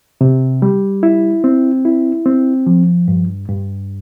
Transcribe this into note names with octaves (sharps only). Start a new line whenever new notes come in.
C3
G3
E4
C4
E4
C4
F3
G2
G2